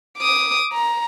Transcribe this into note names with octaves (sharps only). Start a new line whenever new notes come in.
D6 D#6
A#5